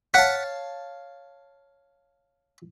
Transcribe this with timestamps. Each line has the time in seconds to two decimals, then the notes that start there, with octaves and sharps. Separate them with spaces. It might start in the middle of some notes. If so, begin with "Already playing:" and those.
0.14 C#5 F5 F#5 A5 F#6 B6